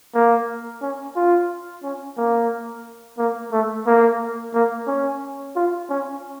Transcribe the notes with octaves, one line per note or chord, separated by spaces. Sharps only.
A#3
C#4
F4
C#4
A#3
A#3
A3
A#3
A#3
C#4
F4
C#4